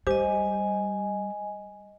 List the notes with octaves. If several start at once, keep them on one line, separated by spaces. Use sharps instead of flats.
G3 G4 C5 D#5 G#5